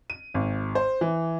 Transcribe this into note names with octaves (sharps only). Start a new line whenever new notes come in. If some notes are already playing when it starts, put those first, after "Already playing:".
D#7
G#1
C5
E3